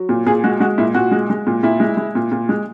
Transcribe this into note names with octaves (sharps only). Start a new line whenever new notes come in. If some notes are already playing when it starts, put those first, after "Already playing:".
Already playing: F#3
A#2
A#2 G#4
G#3 F#4
G#3 F#4
A#2 E4
A#2 F#4
G#3
G#3
A#2
A#2 E4
G#3
G#3
A#2
A#2
G#3